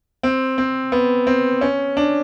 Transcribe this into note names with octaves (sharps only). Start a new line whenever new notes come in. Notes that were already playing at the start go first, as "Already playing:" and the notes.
C4
C4
B3
C4
C#4
D4